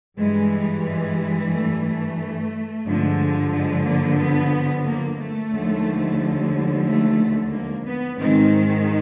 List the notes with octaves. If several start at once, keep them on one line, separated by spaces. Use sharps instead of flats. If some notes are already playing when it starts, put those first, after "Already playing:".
G2 E3 G3 G#3
G#3
A3
A3
G2 D3 F3 G#3
G#3
A#3
B3
A#3
A3
D#2 D3 F3 G#3
A3
A#3
B3
G#2 D#3 G#3 C4